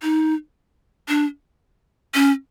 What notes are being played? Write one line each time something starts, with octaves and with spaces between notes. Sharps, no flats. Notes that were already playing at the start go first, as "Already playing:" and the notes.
D#4
D4
C#4